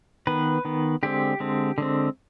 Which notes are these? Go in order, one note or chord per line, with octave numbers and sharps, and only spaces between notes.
D#3 B3 B4
D#3 B3
D3 G#3 C4 G4
D3 G#3 C4
D3 G#3 C4